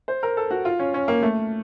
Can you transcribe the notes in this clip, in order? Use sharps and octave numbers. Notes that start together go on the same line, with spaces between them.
C5
A#4
A4
F#4
F4
C#4
C#4
A#3
A3